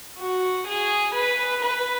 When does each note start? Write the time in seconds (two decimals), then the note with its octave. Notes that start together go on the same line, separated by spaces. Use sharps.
0.19 F#4
0.67 G#4
1.15 B4
1.63 B4